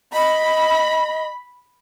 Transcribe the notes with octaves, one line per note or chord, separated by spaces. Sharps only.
D#5 B5